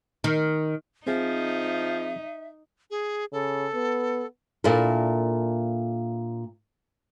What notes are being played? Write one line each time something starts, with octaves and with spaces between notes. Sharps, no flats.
D#3
F3 C4 D#4 G#4 E5
G#4
C#3 A4
B3
A#2 D4 E4 A4 A#4